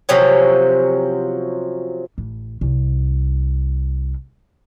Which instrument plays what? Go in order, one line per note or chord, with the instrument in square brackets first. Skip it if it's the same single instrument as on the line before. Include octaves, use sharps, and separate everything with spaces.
[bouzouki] C3 F3 F#3 C#4
[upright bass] A1
C2